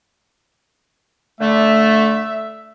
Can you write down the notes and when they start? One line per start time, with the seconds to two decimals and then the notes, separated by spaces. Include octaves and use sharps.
1.41 D3 A3 E5